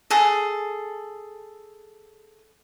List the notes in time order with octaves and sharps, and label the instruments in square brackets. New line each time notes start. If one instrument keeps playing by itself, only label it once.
[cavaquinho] G#4 A4